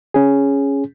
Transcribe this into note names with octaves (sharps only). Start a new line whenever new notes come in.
C#4 G#4